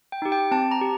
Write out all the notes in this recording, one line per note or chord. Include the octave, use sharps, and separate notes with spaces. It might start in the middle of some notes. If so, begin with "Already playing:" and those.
G5
D#4 G4
G5
C4 A5
A#5
G4